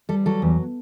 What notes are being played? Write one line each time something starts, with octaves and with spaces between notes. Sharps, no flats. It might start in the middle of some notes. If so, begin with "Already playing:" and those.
G3 A4
F#3 A4
E2